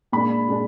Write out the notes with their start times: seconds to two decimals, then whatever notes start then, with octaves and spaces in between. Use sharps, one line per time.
0.12 A#2 G#3 D4 B5
0.48 A#2 G#3 D4